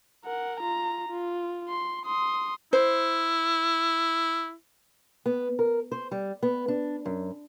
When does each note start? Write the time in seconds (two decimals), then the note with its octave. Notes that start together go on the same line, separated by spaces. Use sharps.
0.25 A#4 F#5
0.60 F4 A#5
1.08 F4
1.68 C6
2.05 C6 D#6
2.73 E4 C5
5.26 B3
5.59 A#4
5.92 C5
6.11 G3
6.43 B3
6.68 D4
7.06 F#2